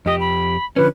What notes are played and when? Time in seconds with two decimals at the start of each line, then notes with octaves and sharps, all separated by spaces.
0.06 F2 G4 D#5
0.20 B5
0.76 D3 F3 C#4 B4